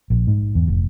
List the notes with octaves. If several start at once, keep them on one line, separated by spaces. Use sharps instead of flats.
A#1
G#2
E2
F1